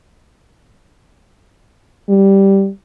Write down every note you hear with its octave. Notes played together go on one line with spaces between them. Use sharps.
G3